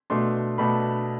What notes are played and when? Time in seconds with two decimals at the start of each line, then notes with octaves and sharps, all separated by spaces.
0.10 B2 A3 D4 C6
0.58 B2 A3 D4 B5